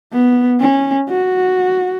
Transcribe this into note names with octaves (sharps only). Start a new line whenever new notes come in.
B3
C#4
F#4